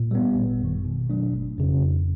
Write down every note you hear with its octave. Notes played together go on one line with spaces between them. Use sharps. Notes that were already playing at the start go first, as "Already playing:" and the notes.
Already playing: A#2
G3 B3
G#1
F#2 D#3
B2
F#3 A3 D4
G1
F2 C#3
F2